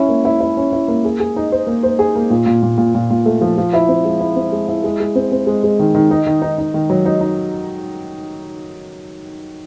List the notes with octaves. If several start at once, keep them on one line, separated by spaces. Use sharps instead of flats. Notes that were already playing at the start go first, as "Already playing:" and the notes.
Already playing: C#4 E4
A#3
E4
E4
C#4
E4
A#3
G#4
G#4
D#4
C5
A#3
C5
G#4
A#3
A#2
A#2
A#2
A#2
A#2
A#2
A3
F3
F3
E4
C4
G#3
E4
C4
G#3
E4
G#3
G#3
C4
C4
G#3
G#3
D#3
D#3
D#4
D#3
D#4
D#4
D#3
F#3
D#4
D#4